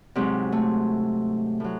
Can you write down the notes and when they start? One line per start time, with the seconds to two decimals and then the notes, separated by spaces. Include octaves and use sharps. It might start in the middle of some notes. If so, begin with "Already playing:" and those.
0.15 G#2 C3 F#3 C4
0.52 A3
1.60 A2 F#3